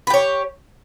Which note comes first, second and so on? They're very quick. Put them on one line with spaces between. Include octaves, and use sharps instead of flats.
B4 G4 C#5